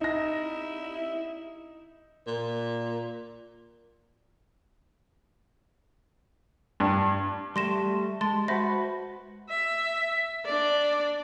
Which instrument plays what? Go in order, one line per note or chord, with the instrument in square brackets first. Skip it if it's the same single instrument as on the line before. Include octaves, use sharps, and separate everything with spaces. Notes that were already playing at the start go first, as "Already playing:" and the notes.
[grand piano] D#4 A#6 [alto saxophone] E4
[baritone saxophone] A#2
[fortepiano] G2
[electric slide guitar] G3 A3 [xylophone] C6 A#6 E7
[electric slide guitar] G#3 [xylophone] A5 C6 A6
[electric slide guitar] F#4 B4 [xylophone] C5 E5 A#6
[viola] E5
D4 D5